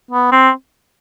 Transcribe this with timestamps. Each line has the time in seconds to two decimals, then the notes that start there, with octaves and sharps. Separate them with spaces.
0.11 B3
0.32 C4